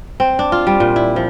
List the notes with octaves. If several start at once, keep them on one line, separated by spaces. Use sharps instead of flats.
C4
D4
F4
G3
A#2
E4
F3